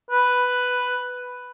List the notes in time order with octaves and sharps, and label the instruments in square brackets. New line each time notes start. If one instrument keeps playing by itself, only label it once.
[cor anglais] B4